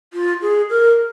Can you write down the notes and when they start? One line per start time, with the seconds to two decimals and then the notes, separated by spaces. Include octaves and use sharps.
0.13 F4
0.42 G#4
0.70 A#4